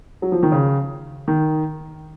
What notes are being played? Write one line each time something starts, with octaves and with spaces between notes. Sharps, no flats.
F#3
F3
D#3
C#3
D#3